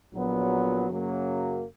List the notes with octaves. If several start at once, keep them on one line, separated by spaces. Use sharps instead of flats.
A#1 A#2 F#3 B3
F#2 C#3 F#3 A#3